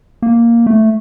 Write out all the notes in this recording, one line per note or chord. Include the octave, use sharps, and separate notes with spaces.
A#3
A3